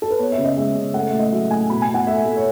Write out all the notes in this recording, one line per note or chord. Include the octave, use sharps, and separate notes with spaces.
A4
B4
B3 C#5
E5
C#3
D#5
G#3 E5
C#3
A3 F#5
E5
A2
D#5
F#3 E5
A2 G#5
B2 B5
G#5
B2
F#5
A3 E5
A3
C#5